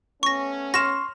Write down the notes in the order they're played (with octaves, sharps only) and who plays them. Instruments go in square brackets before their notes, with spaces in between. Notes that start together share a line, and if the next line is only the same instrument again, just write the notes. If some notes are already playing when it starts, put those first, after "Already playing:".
[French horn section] A3 B3 C#4 [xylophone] C#6 A#6
[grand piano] C6 C#6 F6 [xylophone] A#6 E7